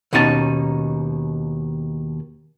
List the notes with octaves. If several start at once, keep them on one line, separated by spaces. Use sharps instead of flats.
D#2 B2 C#4 D#4 G4 A5